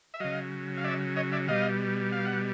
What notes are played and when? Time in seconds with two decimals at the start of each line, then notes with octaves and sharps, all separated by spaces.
0.14 E5
0.20 C#3 F#3 D#5 F5
0.78 F5
0.84 D5 E5
1.16 C#5 D#5
1.32 D5 E5
1.48 B2 G3 D#5 F5
2.12 F5
2.25 F#5